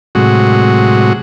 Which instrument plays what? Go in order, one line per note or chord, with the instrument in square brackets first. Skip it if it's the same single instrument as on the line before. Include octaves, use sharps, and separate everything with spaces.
[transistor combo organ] A2 C3 F#3 G#3 F#4